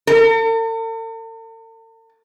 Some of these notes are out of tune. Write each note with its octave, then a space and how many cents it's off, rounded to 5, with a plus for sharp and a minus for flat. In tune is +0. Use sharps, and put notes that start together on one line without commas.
A4 +45